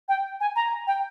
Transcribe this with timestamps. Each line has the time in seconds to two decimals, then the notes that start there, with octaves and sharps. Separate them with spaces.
0.08 G5
0.40 G#5
0.56 A#5
0.87 G5